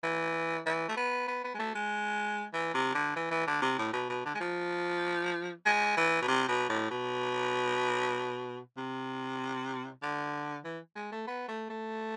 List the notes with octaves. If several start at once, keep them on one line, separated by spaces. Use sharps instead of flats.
E3
E3
A3
B3
B3
B3
G#3
A3
G#3
E3
C3
D3
E3
E3
D3
C3
A2
B2
B2
D3
G#3
F3
G#3
E3
B2
C3
B2
A2
B2
C3
D3
E3
G#3
A3
B3
A3
A3